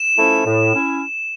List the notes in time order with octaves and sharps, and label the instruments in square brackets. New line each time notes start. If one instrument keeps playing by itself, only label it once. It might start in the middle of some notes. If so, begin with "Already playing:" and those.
Already playing: [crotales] E7
[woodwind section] F3 A3 C#4 E4
A2
C#4 E4